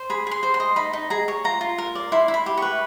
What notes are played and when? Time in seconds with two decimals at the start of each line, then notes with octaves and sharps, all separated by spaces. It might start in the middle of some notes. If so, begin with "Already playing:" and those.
Already playing: C5
0.10 G#4 B5
0.27 G#4 C6
0.43 C5
0.54 C6
0.60 D#5
0.76 D#4 B5
0.93 D#4
1.10 G#4 A#5
1.28 C#5
1.44 F4 A#5
1.61 F4
1.78 A#4
1.95 D5
2.12 E4 C6
2.28 E4
2.34 B5
2.46 G4
2.57 B4 C#6